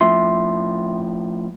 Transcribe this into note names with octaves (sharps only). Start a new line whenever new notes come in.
A2 F3 E5 C6